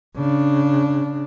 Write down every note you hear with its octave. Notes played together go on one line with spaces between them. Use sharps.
C#3 D4